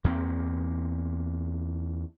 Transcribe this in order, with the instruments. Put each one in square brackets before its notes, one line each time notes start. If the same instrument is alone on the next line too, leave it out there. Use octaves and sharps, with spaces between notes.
[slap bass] E2 A#3 C4